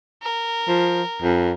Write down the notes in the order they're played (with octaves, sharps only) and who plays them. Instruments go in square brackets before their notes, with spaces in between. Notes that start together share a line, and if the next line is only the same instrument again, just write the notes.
[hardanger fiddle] A#4
[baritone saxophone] F3
F2